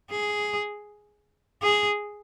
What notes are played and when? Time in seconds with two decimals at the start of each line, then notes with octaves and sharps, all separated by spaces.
0.11 G#4
1.63 G#4